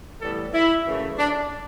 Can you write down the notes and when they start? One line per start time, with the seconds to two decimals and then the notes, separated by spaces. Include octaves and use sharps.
0.21 A2 E3 G3 B3 A4
0.54 E4
0.86 F#2 C#3 E3 A3
1.18 D4